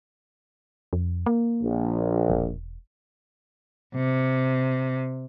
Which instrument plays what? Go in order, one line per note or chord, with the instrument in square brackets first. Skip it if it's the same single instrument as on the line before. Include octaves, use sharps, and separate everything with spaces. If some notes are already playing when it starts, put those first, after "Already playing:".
[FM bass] F2
A#3
[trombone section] A#1
[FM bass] E1
[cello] C3